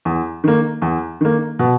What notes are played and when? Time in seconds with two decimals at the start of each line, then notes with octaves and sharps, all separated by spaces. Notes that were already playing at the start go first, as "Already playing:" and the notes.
0.05 E2
0.44 D#3 A#3
0.82 E2
1.21 D#3 A#3
1.59 B2